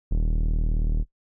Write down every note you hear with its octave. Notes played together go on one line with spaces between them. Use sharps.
D#1